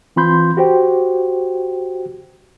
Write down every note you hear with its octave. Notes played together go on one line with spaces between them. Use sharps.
E3 C4 F4 B5 C6 G6
F#4 G4 C5 G5